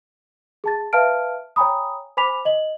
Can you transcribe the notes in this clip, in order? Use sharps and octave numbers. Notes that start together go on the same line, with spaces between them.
G#4 A5 A6
B4 E5 F5 A5 F6 D7
C#5 G5 G#5 A#5 B5 D#6
C5 G#5 B5 D6 B6 F7
D#5 F#7